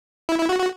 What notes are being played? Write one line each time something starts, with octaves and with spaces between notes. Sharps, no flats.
E4
E4
F#4
F#4